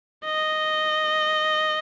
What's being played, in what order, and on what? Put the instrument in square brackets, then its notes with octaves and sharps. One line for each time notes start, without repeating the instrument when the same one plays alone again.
[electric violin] D#5